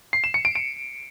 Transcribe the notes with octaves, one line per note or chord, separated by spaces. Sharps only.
C7
E7
C#7
D7
D7